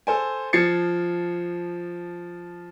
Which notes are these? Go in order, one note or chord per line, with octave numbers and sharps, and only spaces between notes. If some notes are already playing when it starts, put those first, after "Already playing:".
A4 C5 G#5
F3 G#6 A6 C7 C#7